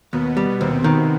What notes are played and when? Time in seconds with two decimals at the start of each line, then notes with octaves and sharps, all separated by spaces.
0.13 D#2 B2 B3
0.37 G3
0.61 D#2 C3 C4
0.84 D#3